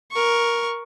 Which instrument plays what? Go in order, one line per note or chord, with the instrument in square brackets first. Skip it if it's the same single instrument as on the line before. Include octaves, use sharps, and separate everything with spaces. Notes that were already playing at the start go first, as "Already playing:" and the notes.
[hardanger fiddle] A#4 C#6